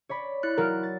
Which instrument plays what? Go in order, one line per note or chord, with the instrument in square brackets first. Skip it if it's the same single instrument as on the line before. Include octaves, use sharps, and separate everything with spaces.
[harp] C#5 D5 B5
[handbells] E4 F#6
[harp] F#3 [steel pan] A#4
[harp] A6